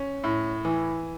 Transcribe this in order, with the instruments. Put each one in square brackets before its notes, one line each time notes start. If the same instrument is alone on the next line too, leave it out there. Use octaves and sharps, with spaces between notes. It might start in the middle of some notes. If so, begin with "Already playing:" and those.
Already playing: [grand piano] C#4
A2
E3